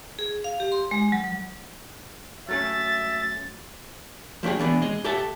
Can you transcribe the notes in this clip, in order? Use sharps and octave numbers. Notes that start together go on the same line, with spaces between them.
G#4
F5
G4
C6
G#3
F#3
F#3 A3 C#4 E5 A6
F3 A3 D4 G4 G#4
E3 B3 D4
G#3 D#5
G4 A4 E5 A5